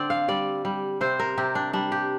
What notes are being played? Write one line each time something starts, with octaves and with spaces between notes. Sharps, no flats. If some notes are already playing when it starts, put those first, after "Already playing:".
Already playing: D3 C4 D5
F5
G3 D5
G3
C3 C5
A#4
C3 G4
D4
G3 D4
G4